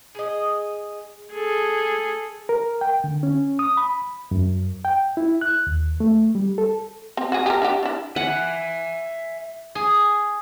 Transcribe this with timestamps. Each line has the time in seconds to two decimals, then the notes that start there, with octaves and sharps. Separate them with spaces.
0.15 G#4 D#5
1.34 G#4 A4
2.49 A#4
2.81 G5
3.04 D3
3.23 C#4
3.59 D#6
3.77 B5
4.31 F#2
4.85 G5
5.17 E4
5.41 F#6
5.67 D#2
6.00 A3
6.35 G3
6.58 A4
7.17 C4
7.32 F#4 G#4
7.46 G4 G#4 A#4
7.62 D4 F#4 G4
7.83 D4 E4
8.16 E5 F#5 G#5
9.75 G#4